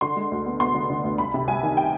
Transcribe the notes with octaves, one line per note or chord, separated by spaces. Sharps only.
D3 C6
G#3
D2
B3
B3 C6
D3
D3
D2
C2 B5
C3
C2 G#5
D#3
G5